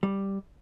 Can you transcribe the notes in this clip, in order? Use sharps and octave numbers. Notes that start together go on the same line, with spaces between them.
G3